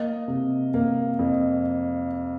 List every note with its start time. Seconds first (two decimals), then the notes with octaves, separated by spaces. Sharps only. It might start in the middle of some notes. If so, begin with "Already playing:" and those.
Already playing: A#3 D#5
0.28 C3
0.74 A#3
1.19 F2